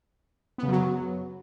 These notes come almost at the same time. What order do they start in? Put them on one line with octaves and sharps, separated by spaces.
B3 C#3 F#2 F#3